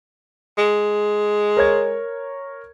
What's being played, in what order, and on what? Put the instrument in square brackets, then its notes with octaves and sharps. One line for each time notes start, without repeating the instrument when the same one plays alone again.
[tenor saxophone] G#3
[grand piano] A#4 C#5 G#6